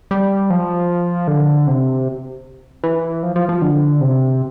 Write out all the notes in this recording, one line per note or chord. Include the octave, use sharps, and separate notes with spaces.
G3
F3
D3
C3
E3
F3
F3
F3
D3
C3